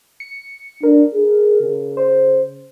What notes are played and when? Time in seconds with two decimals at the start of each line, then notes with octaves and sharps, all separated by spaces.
0.20 C#7
0.83 D4 A#4
1.14 G#4
1.61 C#3
1.97 C5